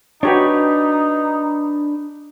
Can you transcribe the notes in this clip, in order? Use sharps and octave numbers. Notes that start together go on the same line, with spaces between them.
D4 D#4 F#4 G4 B4 C#5